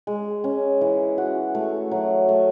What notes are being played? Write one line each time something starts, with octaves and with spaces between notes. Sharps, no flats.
G#3
C#4
E3
F#4
A3
F#3
A3